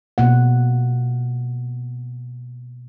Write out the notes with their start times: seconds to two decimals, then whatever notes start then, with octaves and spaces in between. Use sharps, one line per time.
0.18 B2 A#3 F#5